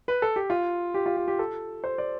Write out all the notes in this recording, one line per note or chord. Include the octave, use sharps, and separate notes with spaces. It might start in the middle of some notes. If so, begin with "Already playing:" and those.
B4
A4
G4
F4
G4
F4
G4
G4
A4
C5
D5